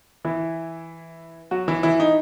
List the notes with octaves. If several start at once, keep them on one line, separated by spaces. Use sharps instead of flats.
E3 E4
F#3 F#4
E3 E4
E3 E4
D#4